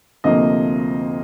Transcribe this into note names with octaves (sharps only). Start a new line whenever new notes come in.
D2 C3 F3 A#3 D#5